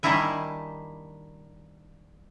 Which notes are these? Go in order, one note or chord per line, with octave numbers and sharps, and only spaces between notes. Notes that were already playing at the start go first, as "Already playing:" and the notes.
D#3 G3 A#3 D4 E4 G#5